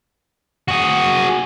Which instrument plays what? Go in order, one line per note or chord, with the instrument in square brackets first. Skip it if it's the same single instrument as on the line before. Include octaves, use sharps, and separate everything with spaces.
[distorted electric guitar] F#4 G#4